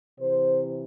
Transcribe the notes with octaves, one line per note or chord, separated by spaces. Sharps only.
C3 E3 C5